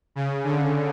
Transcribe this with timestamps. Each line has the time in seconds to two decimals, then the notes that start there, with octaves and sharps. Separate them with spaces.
0.15 C#3
0.44 D3